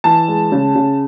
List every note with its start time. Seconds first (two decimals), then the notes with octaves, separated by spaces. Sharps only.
0.04 E3 A5
0.28 G#3
0.52 C#3
0.75 C#3